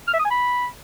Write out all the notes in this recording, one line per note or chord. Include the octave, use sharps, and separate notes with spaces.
F6
E5
D#6
G#5
B5